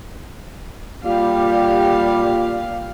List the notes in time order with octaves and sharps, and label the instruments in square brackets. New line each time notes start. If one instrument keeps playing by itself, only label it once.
[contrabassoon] A#2 [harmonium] G3 G4 [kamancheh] F5